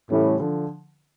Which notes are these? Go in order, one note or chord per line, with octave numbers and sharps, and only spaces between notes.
A2 C#3 E3 G3
D3 F3